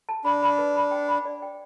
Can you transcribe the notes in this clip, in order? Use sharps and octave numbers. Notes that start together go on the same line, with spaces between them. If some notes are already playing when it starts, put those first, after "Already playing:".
A5
D4 B5
B5
B4
B5
G5
B5
D5
G5